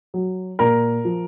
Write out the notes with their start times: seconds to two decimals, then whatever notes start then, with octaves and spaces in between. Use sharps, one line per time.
0.14 F#3
0.59 A#2 A#4 A#5
1.05 F3